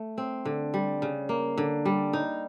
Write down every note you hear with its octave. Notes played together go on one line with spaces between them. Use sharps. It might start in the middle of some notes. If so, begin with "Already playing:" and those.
Already playing: A3
C4
D3
G3
C#3
A#3
D3
G3
D#4